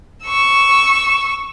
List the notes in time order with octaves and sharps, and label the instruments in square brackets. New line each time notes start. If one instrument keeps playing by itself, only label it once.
[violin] C#6 E6